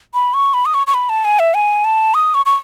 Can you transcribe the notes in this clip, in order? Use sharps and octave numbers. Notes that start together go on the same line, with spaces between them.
B5
C#6
B5
D#6
C#6
C#6
B5
A5
G#5
E5
G#5
A5
D#6
C#6
C#6